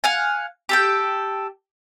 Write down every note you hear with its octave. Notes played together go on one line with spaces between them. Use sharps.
F5 F#5 G#5
G4 A4 G5